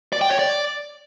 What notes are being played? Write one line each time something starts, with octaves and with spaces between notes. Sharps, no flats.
D5
G5
C#5
D5